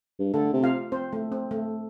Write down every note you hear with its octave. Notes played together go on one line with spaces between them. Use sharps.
G2
D3 A3 A4
C3
F4 F5
C4 C5
A3
C4
A3